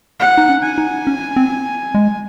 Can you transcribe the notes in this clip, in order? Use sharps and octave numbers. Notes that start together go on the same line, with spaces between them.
F#5
D#4
C#4
G#5
D#4
C#4
C4
G#3